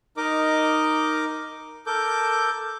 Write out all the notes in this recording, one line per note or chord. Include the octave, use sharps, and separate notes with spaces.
D#4 A#4 D#5 D6
A4 A#4 D6 G6